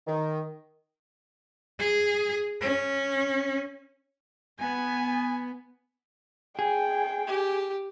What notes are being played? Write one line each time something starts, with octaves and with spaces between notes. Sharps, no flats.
D#3
G#4
C#4
B3 G#5
G#4 G5
G4